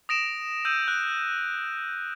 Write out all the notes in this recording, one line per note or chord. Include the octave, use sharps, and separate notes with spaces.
D#6 A#6 D7 E7
E6 G6 D#7
F#6